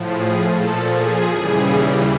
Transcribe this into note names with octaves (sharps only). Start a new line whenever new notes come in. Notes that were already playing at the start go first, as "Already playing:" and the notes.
Already playing: A2 F3
G#4
A#2 F3 A4
G#4
D#2 C#3 E3 G3